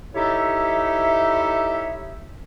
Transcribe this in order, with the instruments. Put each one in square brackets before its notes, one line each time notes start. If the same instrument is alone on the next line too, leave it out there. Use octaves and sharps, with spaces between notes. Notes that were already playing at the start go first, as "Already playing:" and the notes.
[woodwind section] D#4 E4 G4 A4 C#5 E5